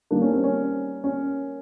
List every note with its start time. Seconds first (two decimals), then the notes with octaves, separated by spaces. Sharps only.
0.11 D#3 G3 A#3 D4
0.22 C#4
0.33 C4
0.44 C#4
1.04 C#4